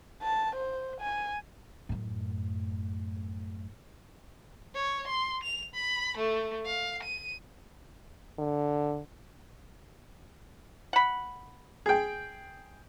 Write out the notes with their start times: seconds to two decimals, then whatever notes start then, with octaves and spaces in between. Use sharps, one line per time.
0.22 A5
0.55 C5
1.01 G#5
1.89 F#2 A2
4.75 C#5
5.07 C6
5.43 F7
5.74 B5
6.17 A3
6.66 F5
7.03 D#7
8.39 D3
10.93 F#5 B5
11.86 G#4 G5